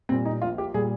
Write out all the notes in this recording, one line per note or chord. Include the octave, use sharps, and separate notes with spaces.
A#2 G3 C4
D#4
A#1 F4
G4
A#2 G3 G#4